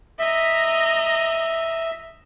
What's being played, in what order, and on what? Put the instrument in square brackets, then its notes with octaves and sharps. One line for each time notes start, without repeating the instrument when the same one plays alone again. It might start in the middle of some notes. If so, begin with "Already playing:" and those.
[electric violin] D#5 A#5 [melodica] E5